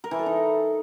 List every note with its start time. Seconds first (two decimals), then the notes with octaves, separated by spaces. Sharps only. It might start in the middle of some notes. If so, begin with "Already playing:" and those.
0.04 A#4
0.11 E3
0.19 A4
0.26 D#4